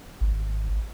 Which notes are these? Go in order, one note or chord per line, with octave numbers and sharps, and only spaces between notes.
G#1